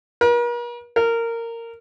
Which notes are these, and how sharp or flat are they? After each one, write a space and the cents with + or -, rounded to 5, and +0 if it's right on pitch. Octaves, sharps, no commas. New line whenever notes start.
A#4 +45
A#4 -15